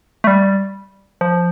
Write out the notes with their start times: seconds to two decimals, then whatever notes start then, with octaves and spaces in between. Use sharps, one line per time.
0.24 A3
0.27 G3
1.21 F3